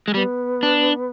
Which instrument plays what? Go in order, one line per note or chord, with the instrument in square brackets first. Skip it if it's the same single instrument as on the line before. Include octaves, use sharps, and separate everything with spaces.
[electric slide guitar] G#3
[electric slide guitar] G3 [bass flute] B3
[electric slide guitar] D4